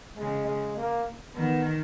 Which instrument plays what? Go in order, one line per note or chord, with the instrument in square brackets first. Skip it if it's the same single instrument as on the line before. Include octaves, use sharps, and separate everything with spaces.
[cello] C#3 [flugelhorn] G#3
[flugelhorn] G#3
A#3
[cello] D#3 [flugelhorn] B3